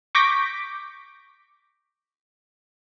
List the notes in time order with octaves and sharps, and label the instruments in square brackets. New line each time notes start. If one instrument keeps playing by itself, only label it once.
[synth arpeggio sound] C#6 D6 G6 A#6 B6 D7